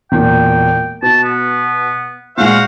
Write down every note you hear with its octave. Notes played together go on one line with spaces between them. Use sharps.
E1 A#2 G5
B2 A5
B3
A#2 G#3 F#4 C5 F5 F#5